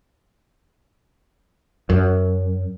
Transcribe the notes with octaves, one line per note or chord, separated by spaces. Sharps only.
F#2